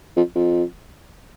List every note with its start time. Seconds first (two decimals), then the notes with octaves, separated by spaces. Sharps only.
0.16 F2
0.35 F2